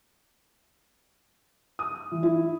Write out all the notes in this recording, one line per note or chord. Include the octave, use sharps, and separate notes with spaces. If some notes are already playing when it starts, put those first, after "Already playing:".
D#6
E3
E4